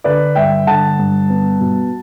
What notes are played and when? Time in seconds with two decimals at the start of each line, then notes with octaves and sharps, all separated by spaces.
0.04 D3 B4 D5
0.35 G2 E5 G5
0.67 D3 F#5 A5
0.99 G2
1.29 B3
1.60 B2